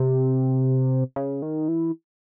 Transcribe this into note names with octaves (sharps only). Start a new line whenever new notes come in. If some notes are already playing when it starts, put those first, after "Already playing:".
Already playing: C3
C#3
D#3
E3